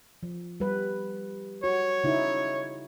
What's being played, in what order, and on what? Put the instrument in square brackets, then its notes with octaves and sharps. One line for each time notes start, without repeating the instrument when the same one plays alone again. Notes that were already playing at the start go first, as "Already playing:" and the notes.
[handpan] F3
G3 B4
[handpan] F#4 [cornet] C#5
[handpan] C#3 D#4 E4